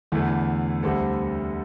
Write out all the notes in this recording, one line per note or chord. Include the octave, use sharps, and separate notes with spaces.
E2 D3 A3 E4
D2 D3 G3 C4 A4